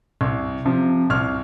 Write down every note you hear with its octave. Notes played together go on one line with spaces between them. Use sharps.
C2
C3 F3
C2 F6